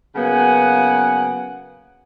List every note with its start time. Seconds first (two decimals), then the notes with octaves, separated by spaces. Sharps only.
0.15 C#3 F#3 A#3 B3 F#5 G#5